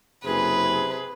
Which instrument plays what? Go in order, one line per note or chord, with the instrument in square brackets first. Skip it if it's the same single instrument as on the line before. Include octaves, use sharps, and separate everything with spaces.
[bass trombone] F#1 [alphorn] C3 [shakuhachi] G#4 [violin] B4